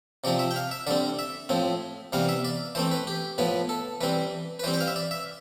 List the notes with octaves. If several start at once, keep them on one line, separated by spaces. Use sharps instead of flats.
C3 F3 C4 D5
E5
G5
F5
E5
D3 G3 C4 D5
E5
A2 F3 C4
C3 E3 G3 B3 F5
E5
D5
E3 A3 C4 C5
B4
G4
A2 F3 B3 B4
A4
E3 G3 C4 B4
B4
E3 G3 C4 C5
G5
F5
E5
D5
E5